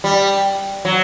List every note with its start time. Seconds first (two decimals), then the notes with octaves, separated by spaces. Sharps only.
0.04 G3
0.85 F#3